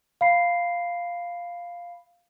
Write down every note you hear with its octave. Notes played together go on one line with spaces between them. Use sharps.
F5 B5 C7